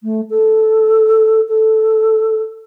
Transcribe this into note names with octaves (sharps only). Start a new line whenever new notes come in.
A3
A4
A4